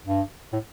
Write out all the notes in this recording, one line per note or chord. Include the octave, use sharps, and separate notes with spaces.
G2
A2